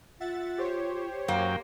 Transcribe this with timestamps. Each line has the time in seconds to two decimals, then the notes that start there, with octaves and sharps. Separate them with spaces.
0.20 F4 E5 F#5 A6
0.58 G4 C5 C#5
1.28 F#2 A#3 G5